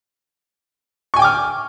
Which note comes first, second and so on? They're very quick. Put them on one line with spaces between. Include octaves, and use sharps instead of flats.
C#6 G#5 G5 D6 F6